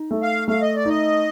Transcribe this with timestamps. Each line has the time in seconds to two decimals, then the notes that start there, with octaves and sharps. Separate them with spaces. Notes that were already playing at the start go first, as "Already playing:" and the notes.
Already playing: D#4
0.11 A3
0.23 F5
0.48 A3 F5
0.62 D#5
0.75 D5
0.85 D#4 D#5